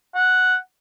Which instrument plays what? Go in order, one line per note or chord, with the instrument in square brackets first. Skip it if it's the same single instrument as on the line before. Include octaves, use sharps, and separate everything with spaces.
[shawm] F#5